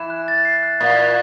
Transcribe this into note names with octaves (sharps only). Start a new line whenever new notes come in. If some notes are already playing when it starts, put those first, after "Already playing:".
Already playing: E3 E7
F#6
A6
C7
F#6
A#2 A6
F#6